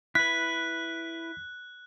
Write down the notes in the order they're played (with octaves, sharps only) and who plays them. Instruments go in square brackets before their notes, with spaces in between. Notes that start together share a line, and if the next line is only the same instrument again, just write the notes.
[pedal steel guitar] E4 B4 [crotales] F#6 [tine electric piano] B6